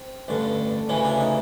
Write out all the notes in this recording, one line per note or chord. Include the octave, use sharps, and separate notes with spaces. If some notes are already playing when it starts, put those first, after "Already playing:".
Already playing: C4
A1 G2 D3
D2 C#3 E3 C#4
D4
D#4